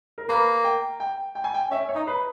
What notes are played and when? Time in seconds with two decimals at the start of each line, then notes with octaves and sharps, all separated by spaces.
0.18 A#4
0.28 A#3 B4
0.64 G5
1.00 G5
1.35 G5
1.44 G#5
1.54 G5
1.71 C#4 E5
1.89 C#5
1.95 D#4
2.07 B4